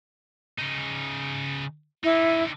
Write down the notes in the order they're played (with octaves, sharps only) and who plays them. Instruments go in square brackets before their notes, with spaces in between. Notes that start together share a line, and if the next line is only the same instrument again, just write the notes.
[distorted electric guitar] C#3 D#4
[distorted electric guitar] D3 D#4 [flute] E4